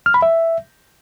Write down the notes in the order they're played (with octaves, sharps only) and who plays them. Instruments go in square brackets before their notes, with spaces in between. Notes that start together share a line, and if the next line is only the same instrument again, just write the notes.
[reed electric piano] F6
B5
E5